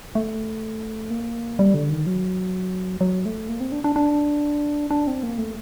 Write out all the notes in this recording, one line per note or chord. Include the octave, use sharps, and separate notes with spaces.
A3
A#3
G3
D3
D#3
F#3
F#3
A3
A#3
C4
D4
D4
D4
D4
C4
A#3
A3